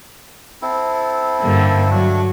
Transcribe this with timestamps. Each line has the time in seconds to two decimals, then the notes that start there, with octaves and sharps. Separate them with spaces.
0.62 C4 E4 A4
1.41 G2 D3 A#3
1.90 F#3 A3 D4